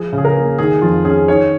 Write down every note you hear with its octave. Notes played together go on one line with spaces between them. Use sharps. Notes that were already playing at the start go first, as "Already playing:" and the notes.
Already playing: F3 G#4
C#3
G#4
A#4
A#3
D#3 G#4
F2 F4
C#4 G#4
D#3 C#5